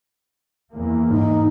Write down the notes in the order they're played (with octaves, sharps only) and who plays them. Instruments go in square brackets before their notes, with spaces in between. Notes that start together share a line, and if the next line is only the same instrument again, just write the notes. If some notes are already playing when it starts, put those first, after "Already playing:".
[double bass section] E2 E3 A#3
[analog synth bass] G#2 [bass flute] D#4